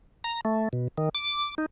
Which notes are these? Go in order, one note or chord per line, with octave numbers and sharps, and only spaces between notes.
A#5
A3
B2
D#3
D6
D#4